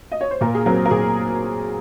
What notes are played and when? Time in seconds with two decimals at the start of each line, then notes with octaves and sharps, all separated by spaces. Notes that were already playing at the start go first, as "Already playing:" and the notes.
0.12 D#5
0.21 C#5
0.31 C5
0.41 A#2 A#4
0.55 G#4
0.66 F#3 C4 A#4
0.86 A#4
0.91 A#2 G#4